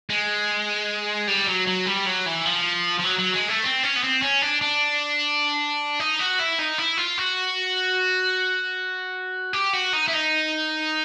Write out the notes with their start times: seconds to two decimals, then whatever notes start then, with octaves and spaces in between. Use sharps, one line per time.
0.10 G#3
1.27 G3
1.47 F#3
1.67 F#3
1.87 G3
2.06 F#3
2.26 E3
2.45 F3
2.99 F3
3.04 F#3
3.19 F#3
3.34 G#3
3.49 A3
3.63 C4
3.83 C#4
3.96 B3
4.04 C4
4.22 C#4
4.42 D4
4.62 D4
6.00 D#4
6.20 F#4
6.40 E4
6.59 D#4
6.78 E4
6.97 F4
7.18 F#4
9.53 G4
9.73 F#4
9.93 D#4
10.08 E4
10.13 D#4